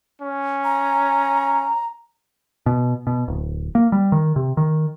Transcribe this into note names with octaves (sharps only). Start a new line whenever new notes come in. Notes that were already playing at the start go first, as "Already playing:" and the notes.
C#4
A#5
B2
B2
D1
A#3
G3
D#3
C3
D#3